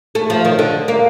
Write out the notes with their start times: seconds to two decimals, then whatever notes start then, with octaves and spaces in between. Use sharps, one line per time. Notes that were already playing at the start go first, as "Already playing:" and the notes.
0.15 A3
0.30 F3
0.45 D#3
0.59 D3
0.88 A#3